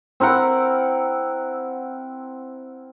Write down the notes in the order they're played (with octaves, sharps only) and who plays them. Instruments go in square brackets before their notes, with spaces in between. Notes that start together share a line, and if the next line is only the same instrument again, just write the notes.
[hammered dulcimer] C4 E4 A#4 F#5